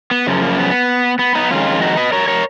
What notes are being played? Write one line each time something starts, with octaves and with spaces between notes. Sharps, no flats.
B3
F#2 C#3 F3
A#3
B3
B3
B3 D#4
F2 D#3 G#3 C#4 F4
D#4 F#4
B4 D#5
A#4 C#5
A#4 C#5